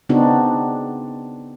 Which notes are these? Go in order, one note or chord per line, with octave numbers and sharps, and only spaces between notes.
C#3 B3 C4 D4 D#4 F#4